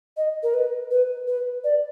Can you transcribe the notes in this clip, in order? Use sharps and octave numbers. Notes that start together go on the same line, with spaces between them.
D#5
A#4
B4
B4
B4
D5